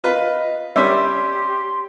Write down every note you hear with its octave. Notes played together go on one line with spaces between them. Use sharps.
F4 B4 D#5
G3 C#4 G4 E5 C6